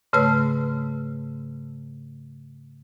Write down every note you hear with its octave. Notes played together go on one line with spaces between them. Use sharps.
G#2 C#3 A3 B4 A5 E6